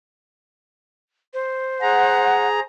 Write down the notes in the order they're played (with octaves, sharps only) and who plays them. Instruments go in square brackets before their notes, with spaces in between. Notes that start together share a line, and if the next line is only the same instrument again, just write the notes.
[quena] C5
[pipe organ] G#4 A#5 [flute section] F#5